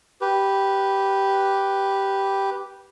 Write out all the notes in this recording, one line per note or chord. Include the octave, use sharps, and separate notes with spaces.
G4 B4